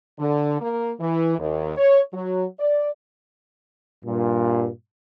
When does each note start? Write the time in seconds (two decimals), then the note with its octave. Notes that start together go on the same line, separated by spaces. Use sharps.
0.19 D3
0.61 A#3
1.01 E3
1.39 D#2
1.77 C#5
2.14 F#3
2.60 D5
4.05 G2 A#2